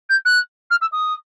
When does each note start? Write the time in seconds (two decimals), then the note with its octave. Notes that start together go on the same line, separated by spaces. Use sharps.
0.10 G6
0.25 F#6
0.71 F6
0.81 E6
0.92 D#6